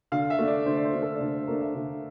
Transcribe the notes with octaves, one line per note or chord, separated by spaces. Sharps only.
D3 F5
E5
A3 D4
D5
D3 C5
D5
C5
A3 D4
A4
D5
D3 C5
C5
A3 D4 A#4
E5
D3